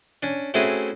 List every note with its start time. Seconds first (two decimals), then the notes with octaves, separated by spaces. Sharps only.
0.23 C#4 D4
0.54 A3 C4 C#4 E4 F#4 G#4